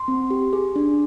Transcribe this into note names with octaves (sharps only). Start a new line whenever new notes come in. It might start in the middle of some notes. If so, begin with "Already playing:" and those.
Already playing: C6
C4
G4
G#4
D4